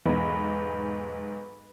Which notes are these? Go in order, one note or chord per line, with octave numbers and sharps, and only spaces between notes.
B1 E2 G#2 B4